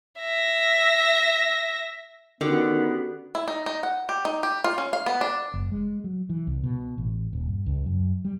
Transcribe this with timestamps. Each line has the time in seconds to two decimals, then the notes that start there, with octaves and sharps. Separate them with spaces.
0.21 E5 A#6
2.41 D3 D#3 B3 C#4 F#4 G4
3.35 E4
3.48 D#4
3.66 D#4
3.83 F#5
4.09 G4
4.25 D#4
4.43 G4
4.64 F4
4.78 C#4
4.93 F5
5.06 B3
5.21 D4
5.54 F#1
5.72 G#3
6.04 F#3
6.29 E3
6.47 C2
6.64 B2
6.98 A1
7.33 D#1
7.47 G2
7.66 C#2
7.86 F#2
8.25 G3